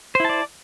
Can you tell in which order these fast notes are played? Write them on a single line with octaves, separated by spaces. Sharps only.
C5 E4 A5 D5